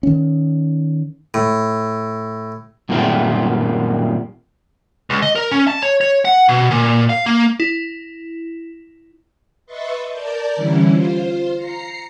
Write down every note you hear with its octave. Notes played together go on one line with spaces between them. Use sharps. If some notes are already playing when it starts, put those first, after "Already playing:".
D#3 C#4
A2
F#2 A#2 D#3 G3 A3 C4
C#2
D#5
A#4
C#4
A5
C#5
C#5
F#5
B2
A#2
F5
A#3
E4
B4 D#5 E5 C6 C#6 A6
A#4 D5 A5 D6 G6
D3 E3 G3 C#4 E4
F4 C5
A#5 C7 C#7